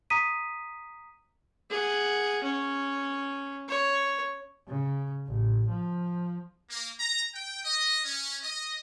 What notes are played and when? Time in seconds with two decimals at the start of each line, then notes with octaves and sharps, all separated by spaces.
0.10 A#5 D#6 B6 D#7
1.70 G#4 F#5
2.43 C#4
3.68 C#5
4.68 C#3
5.27 A1
5.69 F3
6.70 A#3
6.99 A#5
7.35 G5
7.65 D#5
8.05 C#4
8.43 D#5